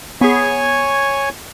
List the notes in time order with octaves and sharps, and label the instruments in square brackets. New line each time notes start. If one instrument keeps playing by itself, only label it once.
[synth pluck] B3 G#4 [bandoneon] C#5 G#5 C#6